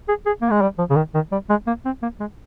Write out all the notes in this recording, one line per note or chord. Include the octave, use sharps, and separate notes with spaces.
G#4
G#4
A#3
G#3
G3
F3
C#3
D#3
D#3
G3
G#3
A#3
C4
A#3
G#3